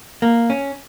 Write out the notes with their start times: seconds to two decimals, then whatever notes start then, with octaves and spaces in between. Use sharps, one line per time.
0.22 A#3
0.50 C#4